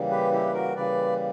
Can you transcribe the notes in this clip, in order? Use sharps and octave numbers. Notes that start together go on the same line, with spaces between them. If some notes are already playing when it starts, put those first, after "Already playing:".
Already playing: C#3 E3 G3 A#3
G4 B4
E4 G4
B4
F#4 A#4
C#3 E3 G3 A#3 B4 D5